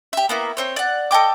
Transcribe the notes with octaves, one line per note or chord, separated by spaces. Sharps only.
G4 E5
A#3 B3 E4
C4 C5 C#5
D5 F#5
A4 D#5 G5 D6